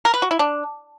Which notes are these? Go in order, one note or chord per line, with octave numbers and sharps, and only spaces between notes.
A#4
B4
F#4
E4
D4